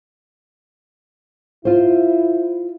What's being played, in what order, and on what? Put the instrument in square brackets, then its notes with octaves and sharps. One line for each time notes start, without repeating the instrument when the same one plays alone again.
[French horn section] E4 [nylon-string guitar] F4 C5